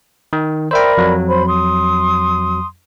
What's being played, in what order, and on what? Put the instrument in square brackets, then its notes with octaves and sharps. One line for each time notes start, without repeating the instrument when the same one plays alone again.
[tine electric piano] D#3
[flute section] A#4 D5 B5 [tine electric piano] C5 E5 G5
[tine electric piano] F2 F#3
[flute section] C5 B5
C6 D#6